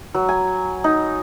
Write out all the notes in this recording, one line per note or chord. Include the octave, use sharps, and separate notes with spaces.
F#3
G#5
D#4